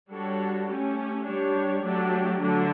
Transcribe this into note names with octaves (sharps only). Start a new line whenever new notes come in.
G3 D4 F#4 A4 C#5
A3 C#4 G4
G3 D4 G4 C#5
F#3 A3 D4 G4
D3 F#3 A3 D4